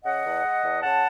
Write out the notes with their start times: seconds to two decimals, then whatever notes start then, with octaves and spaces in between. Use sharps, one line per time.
0.04 C#3 D#5 F#5
0.24 E2
0.43 G#3
0.63 E2
0.83 C#3 F#5 A5